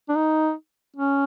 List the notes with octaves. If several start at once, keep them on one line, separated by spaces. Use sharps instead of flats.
D4
D#4
C#4